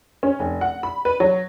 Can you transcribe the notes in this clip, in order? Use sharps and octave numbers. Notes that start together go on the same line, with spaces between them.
C#4
F1
F#5
B5
B4
F#3